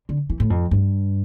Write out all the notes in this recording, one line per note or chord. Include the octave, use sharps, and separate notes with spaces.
D3
E3
A2
F2
G2